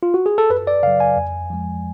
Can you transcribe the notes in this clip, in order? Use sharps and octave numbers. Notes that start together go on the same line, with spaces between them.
F4
F#4
G#4
A4
F#2 B4
D5
C#3 F#3 F5
G#5
F2
F3 G#3